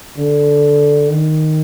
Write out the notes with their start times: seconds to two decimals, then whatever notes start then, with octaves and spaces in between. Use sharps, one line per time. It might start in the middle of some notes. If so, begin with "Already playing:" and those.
0.17 D3
1.10 D#3